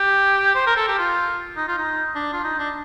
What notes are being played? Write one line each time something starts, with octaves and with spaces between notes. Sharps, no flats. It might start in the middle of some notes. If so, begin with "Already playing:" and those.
Already playing: G4
C5
A#4
A4
G4
F4
D#4
F4
D#4
D4
F4
D#4
D4